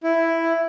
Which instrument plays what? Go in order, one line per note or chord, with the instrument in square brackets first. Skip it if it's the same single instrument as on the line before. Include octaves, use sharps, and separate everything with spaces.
[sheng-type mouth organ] E4